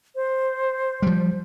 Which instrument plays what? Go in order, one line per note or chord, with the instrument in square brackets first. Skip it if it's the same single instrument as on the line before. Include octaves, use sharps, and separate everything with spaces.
[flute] C5
[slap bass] F3 G3